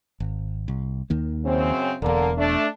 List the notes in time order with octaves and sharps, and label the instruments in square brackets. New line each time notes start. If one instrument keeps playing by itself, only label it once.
[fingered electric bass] G#1
C2
D#2 D#3 A#3
[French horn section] F#2 C#3 C4
[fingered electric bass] E1 E2 [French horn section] D3 A#3
[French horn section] A3 D4